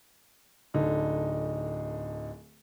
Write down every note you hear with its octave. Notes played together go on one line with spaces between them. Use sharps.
D1 D3 D#4